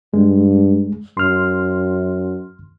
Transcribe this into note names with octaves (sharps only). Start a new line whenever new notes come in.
G2 G#3
F#2 C6 F6